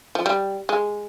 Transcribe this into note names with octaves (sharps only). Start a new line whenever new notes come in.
F3
G3
G#3